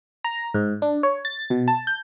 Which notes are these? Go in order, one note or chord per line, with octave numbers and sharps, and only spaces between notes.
A#5
G#2
D4
C#5
A6
B2
A5
G6